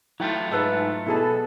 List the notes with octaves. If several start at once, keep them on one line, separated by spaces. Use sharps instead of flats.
F#3 A3 E4 F4 G5
G#2 B4 E5 A5
B2 E4 G#4 A4 B4 A5